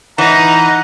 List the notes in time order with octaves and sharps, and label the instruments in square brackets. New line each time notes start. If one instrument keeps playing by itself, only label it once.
[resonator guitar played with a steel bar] E3 [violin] D#4 [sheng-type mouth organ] F#5 [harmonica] A#5